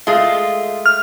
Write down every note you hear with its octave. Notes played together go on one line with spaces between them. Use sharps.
G#3 A3 F4
F6